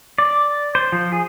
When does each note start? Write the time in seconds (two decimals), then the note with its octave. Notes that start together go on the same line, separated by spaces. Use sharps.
0.18 D5
0.75 C5
0.92 F3
1.12 G#4